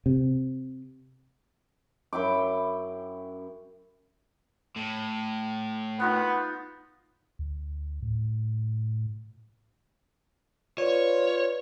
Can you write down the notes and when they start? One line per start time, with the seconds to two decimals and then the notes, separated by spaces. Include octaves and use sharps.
0.06 C3
2.13 F#2 E4 G5 D6
4.76 A2
6.00 B3 D#4 F4 F#5
7.39 D2
8.03 A2
10.78 F4 B4 C#5 D5